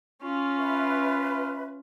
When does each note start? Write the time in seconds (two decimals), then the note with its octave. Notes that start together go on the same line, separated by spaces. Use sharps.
0.22 C#4 F4
0.58 B4 E5